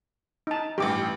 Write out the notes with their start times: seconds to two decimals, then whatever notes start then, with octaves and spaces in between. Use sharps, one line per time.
0.47 D#4 A5
0.78 A1 G2 G4 D6